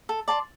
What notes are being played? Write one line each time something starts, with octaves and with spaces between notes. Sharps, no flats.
A4
D5 A5 C6